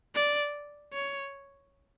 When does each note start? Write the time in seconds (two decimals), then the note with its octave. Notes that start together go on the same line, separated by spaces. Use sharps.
0.15 D5
0.93 C#5